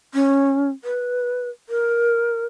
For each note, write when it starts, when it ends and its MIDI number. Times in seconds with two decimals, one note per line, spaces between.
0.14 0.70 61
0.84 1.49 71
1.69 2.45 70